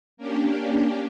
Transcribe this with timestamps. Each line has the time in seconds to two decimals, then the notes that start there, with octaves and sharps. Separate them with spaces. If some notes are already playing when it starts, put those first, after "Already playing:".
0.17 A#3 C#4 D4 G4